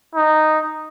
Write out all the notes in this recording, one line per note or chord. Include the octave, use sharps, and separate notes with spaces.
D#4